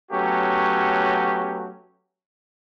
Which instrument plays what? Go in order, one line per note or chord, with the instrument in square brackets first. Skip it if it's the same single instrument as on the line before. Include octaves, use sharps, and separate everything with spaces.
[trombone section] F#3 A3 B3 C#4 F#4 G4